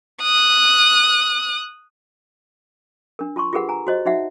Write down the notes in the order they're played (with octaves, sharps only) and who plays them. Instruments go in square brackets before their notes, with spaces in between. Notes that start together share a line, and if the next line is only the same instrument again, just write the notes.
[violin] D#6 F#6
[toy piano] D4 A#4
F4 A5 C6 C#6
F4 G4 G#4 A#4 B4 F#5
G#5 A#5
F#4 C5 D#5
D#4 F#4 E5 F#5